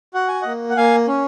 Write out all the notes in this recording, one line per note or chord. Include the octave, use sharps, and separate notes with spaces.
F#4 F#5
G#5
A#3 D#5 F#5
F#5
A#3 F5 G#5
C#4